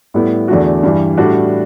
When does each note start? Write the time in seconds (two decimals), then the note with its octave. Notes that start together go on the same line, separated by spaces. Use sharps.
0.14 A2 G3 B3 E4
0.48 E2 D3 A3 D4 F#4
0.83 G2 E3 G3
1.17 A2 G3 D4 F#4